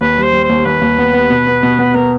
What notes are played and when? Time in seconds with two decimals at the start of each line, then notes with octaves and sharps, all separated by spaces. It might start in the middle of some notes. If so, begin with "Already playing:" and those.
0.01 D#2 B4
0.18 G3 C5
0.33 G3
0.44 C5
0.49 D#2
0.65 D#2 B4
0.81 D#2
0.98 B3
1.13 B3
1.30 B2
1.47 B3
1.63 B2
1.79 B3
1.94 B3 A#4